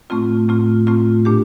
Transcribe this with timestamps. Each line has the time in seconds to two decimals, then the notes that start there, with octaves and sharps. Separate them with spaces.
0.10 A2 A3 C4 F4
0.48 A2 A3 C4 F4
0.87 A2 A3 C4 F4
1.25 A#2 A3 D4 G4